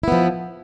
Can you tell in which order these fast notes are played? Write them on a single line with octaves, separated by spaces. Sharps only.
E4 B3 F3